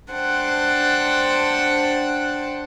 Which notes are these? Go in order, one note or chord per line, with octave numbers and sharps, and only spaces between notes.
D4 C5 F#5 G5 A5